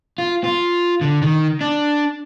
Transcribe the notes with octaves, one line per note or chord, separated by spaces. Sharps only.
F4
F4
D3
D#3
D4